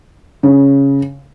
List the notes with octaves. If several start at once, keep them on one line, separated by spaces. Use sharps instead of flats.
C#3